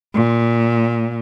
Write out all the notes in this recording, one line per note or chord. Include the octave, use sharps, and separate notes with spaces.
A#2